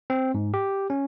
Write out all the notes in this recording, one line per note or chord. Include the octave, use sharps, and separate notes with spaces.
C4
G#2
G4
C#4